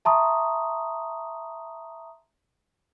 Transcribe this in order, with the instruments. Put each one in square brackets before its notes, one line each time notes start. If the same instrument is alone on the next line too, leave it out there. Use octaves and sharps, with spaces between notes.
[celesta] E5 A5 A#5 C6 C#6 D#6